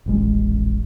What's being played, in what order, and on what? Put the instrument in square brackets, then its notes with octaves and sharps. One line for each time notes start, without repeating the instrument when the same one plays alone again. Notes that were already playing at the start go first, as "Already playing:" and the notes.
[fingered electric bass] D#1 A1 G#3